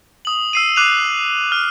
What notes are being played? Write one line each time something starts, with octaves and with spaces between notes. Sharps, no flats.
D#6 F#7
E6 C7 D#7
D6 F#6 C7 D#7 F7
F6